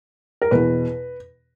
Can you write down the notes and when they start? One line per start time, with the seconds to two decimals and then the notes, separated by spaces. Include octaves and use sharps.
0.42 A#4
0.51 E2 B2 B4